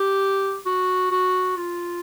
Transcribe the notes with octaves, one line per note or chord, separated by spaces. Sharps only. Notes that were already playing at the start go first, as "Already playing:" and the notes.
Already playing: G4
F#4
F#4
F4